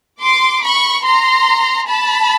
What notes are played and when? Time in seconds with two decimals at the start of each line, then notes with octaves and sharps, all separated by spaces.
0.21 C6 D6
0.63 B5 C#6
1.04 A#5 C6
1.88 A5 B5